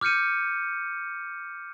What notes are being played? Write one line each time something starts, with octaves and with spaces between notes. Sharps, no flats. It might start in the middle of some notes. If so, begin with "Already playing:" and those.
D6 F6 G6 C#7 D#7